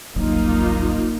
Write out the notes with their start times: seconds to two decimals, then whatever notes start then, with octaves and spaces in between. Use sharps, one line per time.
0.16 D#1 A1 F#3 A#3 D#4 F4